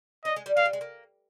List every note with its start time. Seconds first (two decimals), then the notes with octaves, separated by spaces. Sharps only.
0.25 D#4 D#5
0.36 G#3
0.46 G3
0.57 A#3 F5
0.66 G3
0.73 G#3
0.81 A#3